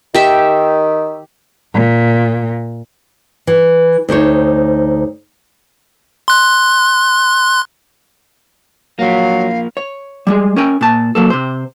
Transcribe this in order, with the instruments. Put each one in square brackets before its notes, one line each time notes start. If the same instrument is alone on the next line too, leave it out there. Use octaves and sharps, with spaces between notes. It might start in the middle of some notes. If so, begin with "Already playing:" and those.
[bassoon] D#3 [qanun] G4 E5
[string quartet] A#2
[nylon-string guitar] E3
D2 D#4 C5 C#5
[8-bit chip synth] C6 F#6
[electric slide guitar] F3 A#3 [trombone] F#3 [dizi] F5
[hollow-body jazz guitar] C#5
G3 G#3 G#4
C#4 A#4 G5 G#5
A#2 A5
F#3 A#3 A4
C3 C5